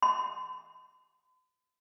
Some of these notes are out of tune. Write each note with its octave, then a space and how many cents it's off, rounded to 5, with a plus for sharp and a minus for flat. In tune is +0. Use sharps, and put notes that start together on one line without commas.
C6 -45